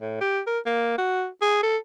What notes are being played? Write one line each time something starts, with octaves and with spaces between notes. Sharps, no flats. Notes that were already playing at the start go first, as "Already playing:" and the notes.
A2
G4
A#4
A#3
F#4
G#4
A4